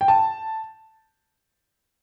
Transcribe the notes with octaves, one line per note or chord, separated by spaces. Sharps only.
G5
A5